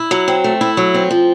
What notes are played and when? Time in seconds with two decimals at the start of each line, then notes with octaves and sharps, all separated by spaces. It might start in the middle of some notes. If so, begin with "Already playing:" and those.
Already playing: E4
0.11 F#3
0.28 C4
0.44 A3
0.61 E4
0.77 F#3
0.94 C4
1.11 F3